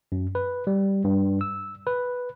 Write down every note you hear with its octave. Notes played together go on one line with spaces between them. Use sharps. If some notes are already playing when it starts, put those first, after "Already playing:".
F#2
B4
G3
G2
E6
B4